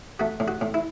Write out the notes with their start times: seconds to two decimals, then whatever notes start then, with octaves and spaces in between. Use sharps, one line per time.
0.20 A3 F#4
0.40 A2
0.48 F#4
0.61 A2
0.74 E4